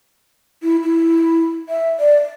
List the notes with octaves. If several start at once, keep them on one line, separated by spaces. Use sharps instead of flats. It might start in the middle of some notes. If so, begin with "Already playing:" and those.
E4
E4
E5
D5